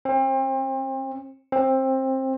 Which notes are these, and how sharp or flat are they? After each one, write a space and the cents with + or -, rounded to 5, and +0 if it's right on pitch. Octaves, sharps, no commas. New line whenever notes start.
C4 +35
C4 +20